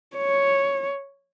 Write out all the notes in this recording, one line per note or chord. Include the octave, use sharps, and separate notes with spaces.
C#5